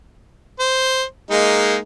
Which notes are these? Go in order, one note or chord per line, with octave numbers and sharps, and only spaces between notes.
C5
G#3 A#3 D#4